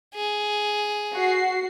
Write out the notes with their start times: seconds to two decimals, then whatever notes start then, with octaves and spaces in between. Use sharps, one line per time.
0.15 G#4
1.14 F#4 C7